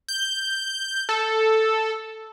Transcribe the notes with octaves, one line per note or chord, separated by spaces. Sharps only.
G6
A4